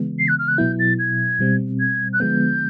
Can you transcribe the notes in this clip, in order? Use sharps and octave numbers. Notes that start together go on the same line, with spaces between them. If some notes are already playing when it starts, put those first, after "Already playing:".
Already playing: C#3 E3 G#3 B3
C7
F#6
F6
F#6
B2 F#3 B3 E4 G6
A6
G#6
B2 G3 C4
G#6
F#6
D3 F3 G#3 B3 G6